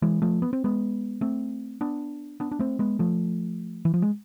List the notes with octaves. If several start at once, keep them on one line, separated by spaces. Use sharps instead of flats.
E3 G#3
F3 A3
B3
C4
G#3 B3
A3 C4
B3 D4
B3 D4
D4
A3 C4
G#3 B3
F3 A3
E3
F3
G#3